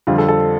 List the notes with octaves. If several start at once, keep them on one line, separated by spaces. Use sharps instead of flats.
F2 D3 G3 C4 F4
A4
A4